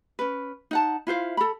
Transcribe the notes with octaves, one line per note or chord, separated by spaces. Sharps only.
C#4 B4
D#4 F#5 A5
E4 F4 C5 F5
A4 B5